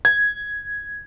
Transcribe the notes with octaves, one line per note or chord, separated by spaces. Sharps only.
G#6